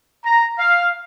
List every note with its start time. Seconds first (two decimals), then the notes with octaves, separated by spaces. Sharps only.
0.25 A#5
0.59 F5